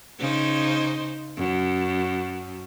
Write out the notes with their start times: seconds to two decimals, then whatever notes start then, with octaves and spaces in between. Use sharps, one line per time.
0.20 C#3 D#4 C5
1.37 F#2